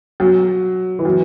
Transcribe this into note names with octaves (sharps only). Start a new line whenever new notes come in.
F#3
E3
F#3